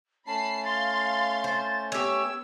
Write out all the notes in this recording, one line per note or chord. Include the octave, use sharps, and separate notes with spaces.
A3 C#4 A5 B5 C7
F5 C6 A6
C5
B3 G4 C#5 E6